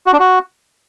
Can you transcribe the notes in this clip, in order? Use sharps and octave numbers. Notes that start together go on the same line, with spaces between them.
F#4
D4
F#4